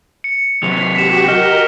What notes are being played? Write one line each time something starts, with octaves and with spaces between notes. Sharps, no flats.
C#7
C3 F#3 B6 C7 F7
F#4 G4 B6 E7
A#4 D#5 F6